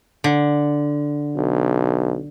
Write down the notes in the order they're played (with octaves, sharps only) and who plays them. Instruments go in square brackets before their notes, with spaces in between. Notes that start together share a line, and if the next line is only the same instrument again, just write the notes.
[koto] D3
[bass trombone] B1